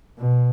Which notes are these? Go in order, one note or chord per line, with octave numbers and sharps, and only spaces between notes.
B2